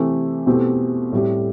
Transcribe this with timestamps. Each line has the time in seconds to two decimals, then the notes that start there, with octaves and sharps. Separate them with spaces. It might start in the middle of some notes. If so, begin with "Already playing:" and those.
Already playing: C3 E3 A3 C4 G4
0.46 B2 A3 C4 E4 G4
1.12 A2 G3 C4 G4